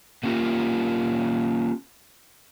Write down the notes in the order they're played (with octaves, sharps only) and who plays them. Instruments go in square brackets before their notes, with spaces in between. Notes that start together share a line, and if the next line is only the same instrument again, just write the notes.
[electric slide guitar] A3 A#3 C#4 F4 G4 A#4